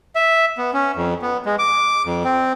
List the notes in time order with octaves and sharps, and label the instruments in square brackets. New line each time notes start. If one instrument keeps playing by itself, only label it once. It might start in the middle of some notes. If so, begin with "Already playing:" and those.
[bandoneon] E5
B3
C#4
F2
B3
G#3
D6
F2
C4